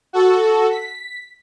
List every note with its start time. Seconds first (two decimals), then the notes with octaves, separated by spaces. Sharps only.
0.13 F#4 A4
0.70 B6